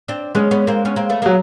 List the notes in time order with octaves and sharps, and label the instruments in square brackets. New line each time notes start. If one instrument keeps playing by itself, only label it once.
[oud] C4 D4
[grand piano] G#3 [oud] B3 C#4
[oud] B3 C#4
A#3 C4
B3 C#4
A#3 C4
A3 B3
[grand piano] F#3 [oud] G#3 A#3